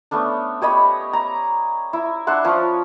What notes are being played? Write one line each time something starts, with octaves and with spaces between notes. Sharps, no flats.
A3 B3 C#4 D4
G4 C#5 D#5 B5
A#5
E4
D4 E5 F#5 C6
F3 C#4 F4 C#5